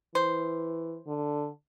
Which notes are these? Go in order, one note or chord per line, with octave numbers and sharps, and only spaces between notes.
E3 C5
D3